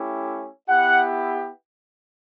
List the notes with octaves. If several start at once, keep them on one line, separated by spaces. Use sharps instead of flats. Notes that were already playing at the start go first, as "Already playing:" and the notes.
Already playing: A3 C#4 E4 G4
B3 E4 G4 F#5